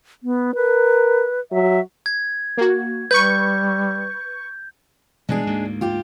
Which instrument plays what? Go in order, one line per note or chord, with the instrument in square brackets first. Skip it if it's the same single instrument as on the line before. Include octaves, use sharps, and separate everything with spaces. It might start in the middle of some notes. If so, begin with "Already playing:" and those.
[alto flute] B3
[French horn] A#4 [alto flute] B4
[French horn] F#3 [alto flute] E5
[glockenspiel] G#6
[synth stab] A#3 F#4
[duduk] G3 [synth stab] B4 C#6 [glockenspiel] G6
[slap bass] B2 E3 G3 [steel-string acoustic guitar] G#3 D4 G#4
[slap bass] D2 G#2 A#3
[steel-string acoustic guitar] F4 G4